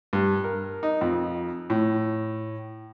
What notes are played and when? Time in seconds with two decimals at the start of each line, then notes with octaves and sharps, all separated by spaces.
0.13 G2
0.44 A#4
0.83 D#4
1.01 F2
1.70 A2